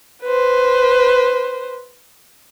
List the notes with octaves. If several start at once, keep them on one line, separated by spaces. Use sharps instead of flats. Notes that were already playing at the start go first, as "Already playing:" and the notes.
B4 C5